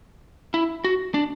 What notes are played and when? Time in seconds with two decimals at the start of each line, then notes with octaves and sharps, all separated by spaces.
0.54 E4
0.84 F#4
1.14 D4